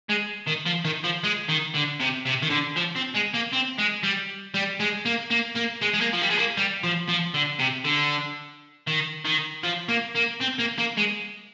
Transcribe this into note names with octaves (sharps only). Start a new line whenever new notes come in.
G#3
D#3
F3
D#3
F3
G#3
D#3
D3
C3
C3
D#3
D3
F3
C4
G#3
A#3
C4
G#3
G3
G3
G#3
A#3
A#3
A#3
G#3
G#3
A#3
F3
G3
G#3
A#3
G3
F3
F3
D3
C3
D3
D#3
D#3
F3
A#3
A#3
C4
A#3
A#3
G#3